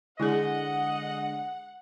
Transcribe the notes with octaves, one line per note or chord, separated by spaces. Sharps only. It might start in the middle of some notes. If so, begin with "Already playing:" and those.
D3 G#3 E4 G#4 D#5 F#5